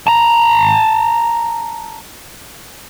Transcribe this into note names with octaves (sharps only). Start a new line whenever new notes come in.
A5 A#5